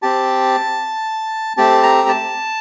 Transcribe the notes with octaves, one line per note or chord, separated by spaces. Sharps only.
C4 G4 A5
A3 C4 G4 A5
A#5
A5